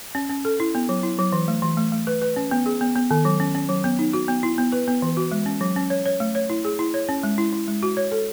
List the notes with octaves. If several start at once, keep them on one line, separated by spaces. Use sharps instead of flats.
C#4
C#4
A4
E4
B3
F#3
E4
F#3
E3
A3
E3
A3
A3
B4
B4
C#4
B3
G#4
B3
B3
D#3
F#3
C#4
C#4
F#3
B3
D#4
F#4
B3
E4
B3
B4
B3
E3
F#4
G#3
C#4
F#3
C#4
C#5
C#5
A3
C#5
E4
G#4
E4
C#5
C#4
G#3
E4
E4
G#3
F#4
C#5
A4